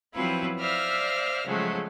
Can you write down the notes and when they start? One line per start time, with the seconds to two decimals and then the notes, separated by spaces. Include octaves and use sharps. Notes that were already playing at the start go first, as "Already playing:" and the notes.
0.14 F3 F#3 C4 E4 F4 B4
0.59 C5 D5 E5 F5 F6 A#6
1.47 C#3 F3 F#3 G#3 A3